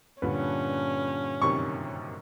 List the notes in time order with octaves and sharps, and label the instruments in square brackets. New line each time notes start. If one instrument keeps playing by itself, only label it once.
[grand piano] G2 A#2 D3 [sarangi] C#4 [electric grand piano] B4
[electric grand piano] F#2 C3 D#3 [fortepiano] C#6